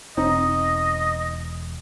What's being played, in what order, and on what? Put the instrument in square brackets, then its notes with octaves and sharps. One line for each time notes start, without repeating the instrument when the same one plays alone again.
[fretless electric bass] E1 [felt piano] C4 D#4 [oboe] D#5